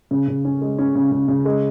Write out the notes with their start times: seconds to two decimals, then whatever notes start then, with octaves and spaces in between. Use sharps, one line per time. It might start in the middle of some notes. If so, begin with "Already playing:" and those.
0.11 C#3
0.28 C#3
0.45 C#4
0.62 G#3
0.78 C#4
0.95 C#3
1.11 C#3
1.28 C#3
1.45 G#3